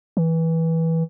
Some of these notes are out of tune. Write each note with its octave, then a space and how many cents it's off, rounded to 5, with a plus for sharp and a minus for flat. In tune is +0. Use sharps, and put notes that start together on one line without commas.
E3 -15